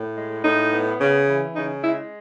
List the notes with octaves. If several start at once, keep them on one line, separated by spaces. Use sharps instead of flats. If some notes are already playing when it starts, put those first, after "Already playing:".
Already playing: A2
G#3
A2 D#4
B3
C#3
E3
C#3 D#4
G#3 E4